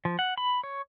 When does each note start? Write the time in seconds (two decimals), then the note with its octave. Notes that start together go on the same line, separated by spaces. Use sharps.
0.05 F3
0.19 F#5
0.38 B5
0.63 C#5